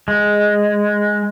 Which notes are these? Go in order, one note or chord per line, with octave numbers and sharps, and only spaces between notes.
G#3